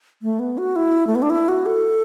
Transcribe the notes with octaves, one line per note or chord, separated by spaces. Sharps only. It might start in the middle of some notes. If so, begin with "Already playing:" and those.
A3
B3
F#4
E4
A3
B3
D4
E4
F#4
A4